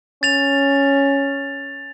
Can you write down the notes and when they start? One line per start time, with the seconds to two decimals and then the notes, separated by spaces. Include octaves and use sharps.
0.23 C#4 A6 F7